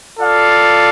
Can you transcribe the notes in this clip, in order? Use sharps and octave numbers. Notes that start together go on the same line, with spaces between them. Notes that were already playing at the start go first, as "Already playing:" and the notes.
F4 A4 D5 F5